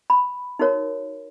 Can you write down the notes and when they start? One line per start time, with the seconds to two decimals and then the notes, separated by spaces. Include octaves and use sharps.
0.10 B5
0.59 D#4 F#4 A#4 C#5